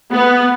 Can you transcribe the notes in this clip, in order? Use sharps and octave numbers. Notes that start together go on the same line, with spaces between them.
B3